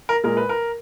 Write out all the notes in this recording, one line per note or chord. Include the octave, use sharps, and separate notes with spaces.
A#4
A#2 G#3 A#4
B4
A#4